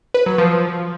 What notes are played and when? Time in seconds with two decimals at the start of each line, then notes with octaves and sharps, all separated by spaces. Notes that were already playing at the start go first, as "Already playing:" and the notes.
0.14 B4
0.26 F#3
0.38 F3